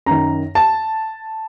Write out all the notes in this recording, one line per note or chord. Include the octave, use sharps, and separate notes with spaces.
F#2 D#3 A#5
A5